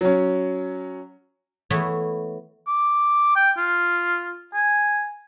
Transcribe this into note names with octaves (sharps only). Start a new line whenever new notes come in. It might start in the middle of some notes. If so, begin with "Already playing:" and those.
F#3 C#4
E3 A3 B3 E4 C#5
D6
G5
F4
G#5